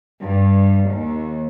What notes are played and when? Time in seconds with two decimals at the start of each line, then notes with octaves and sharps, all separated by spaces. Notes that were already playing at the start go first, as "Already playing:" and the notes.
0.22 G2
0.91 D#2